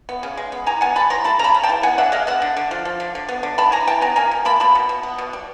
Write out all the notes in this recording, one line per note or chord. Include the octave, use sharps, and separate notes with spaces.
B3
C#3
G#3
B3
E3 G#5 A#5
B3 F#5 G#5
G3 A5 B5
E3 A#5 C6
A3 A5 B5
C#3 A5 A#5 B5
C#3
G5 A5
E3
B3 F#5 G#5
D3 E5 F#5
G#3 D#5 F5
B3 E5 F#5
D3
D3
F3
F3
D3
D3
B3
D3
B3 A5 B5
E3 G#5 A#5
E3 G5 A5
B3 G#5 A#5
A#3 G#5 A#5
B2
A#3 A5 B5
B2 A5 B5
B2
B2
B3
B2
G3